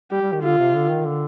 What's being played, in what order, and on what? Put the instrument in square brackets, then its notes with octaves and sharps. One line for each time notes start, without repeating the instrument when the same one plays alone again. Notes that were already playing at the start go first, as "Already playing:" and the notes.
[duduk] G3 [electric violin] G4
[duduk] G3
D#3
[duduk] D3 [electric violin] F4
[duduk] C3
D3
D#3
D3